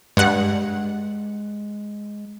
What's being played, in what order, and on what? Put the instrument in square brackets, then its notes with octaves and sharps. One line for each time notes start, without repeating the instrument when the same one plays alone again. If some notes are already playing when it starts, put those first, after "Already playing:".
[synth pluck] G2 F#5 [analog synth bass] G#3